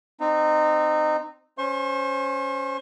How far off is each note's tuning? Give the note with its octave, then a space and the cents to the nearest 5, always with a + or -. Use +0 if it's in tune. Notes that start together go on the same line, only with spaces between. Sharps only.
C4 -15 D#4 -20
C#4 +0 C5 +0 C#6 -45